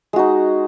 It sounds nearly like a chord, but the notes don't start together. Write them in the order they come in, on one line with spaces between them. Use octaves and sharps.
G#3 F#4 D#4